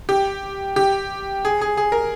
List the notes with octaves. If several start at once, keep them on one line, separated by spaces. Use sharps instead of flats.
G4
G4
G#4
G#4
G#4
A#4